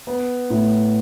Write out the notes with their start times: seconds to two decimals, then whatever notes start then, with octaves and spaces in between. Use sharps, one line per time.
0.07 B3
0.50 A2